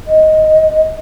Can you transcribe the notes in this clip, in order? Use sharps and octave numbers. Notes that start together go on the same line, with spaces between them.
D#5